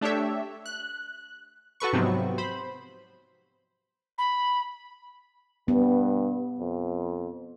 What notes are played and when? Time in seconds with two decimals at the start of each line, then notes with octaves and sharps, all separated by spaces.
0.01 A3 D4 G4 C#5 E5
0.66 F#6
1.80 F#4 A4 B4 C#6
1.93 G#2 C3 F3 F#3 B3 C4
2.38 C5 B5
4.18 B5
5.68 G2 B3
6.60 F2